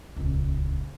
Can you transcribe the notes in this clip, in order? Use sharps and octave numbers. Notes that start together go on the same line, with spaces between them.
D#1 C#2